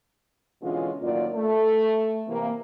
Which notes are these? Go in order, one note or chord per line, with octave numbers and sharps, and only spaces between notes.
B2 D3 E3 G#3 C#4 F4
F#2 A2 D#3 A#3 F4 D5
A3
C3 E3 A#3